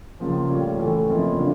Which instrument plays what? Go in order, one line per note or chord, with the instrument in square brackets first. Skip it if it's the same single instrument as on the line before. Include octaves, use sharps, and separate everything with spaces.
[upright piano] C#2 C#3 F3 A#3
A2 G3 C#4 F4
A2 E3 A3
F2 C#3 F3 A#3 E4
D3 G3 D4 F4